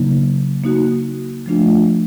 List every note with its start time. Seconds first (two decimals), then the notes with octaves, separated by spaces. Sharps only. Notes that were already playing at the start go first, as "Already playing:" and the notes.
Already playing: C#3 F#3 A#3 D#4
0.64 A#3 D#4 F#4
1.46 F3 A3 D4 F4